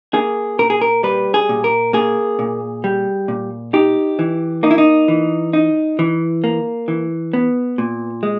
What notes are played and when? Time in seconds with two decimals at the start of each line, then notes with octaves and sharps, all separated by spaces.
0.14 A#3 G#4
0.59 A#2 A#4
0.70 G#4
0.81 A#4
1.03 G3 B4
1.34 G#4
1.49 A#2
1.64 A#4
1.93 A#3 G#4
2.39 A#2
2.84 G3
3.28 A#2
3.73 D#4 G4
4.19 E3
4.63 A#3 D#4
4.71 E4
4.78 D#4
5.08 E3
5.53 D#4
5.99 E3
6.44 A#3
6.88 E3
7.33 B3
7.78 A#2
8.23 G#3